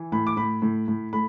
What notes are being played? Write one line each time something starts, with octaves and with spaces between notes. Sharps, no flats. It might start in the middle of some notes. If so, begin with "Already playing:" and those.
Already playing: E3
A2 B5
D6
A2 B5
A2
A2
A3 B5